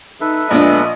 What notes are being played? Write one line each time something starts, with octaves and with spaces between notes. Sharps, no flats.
D#4 A4 B4 E5
A#1 G#3 B3 D4 D#5